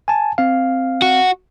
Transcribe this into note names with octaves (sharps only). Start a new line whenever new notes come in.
G#5 A5
C4 F5
F#4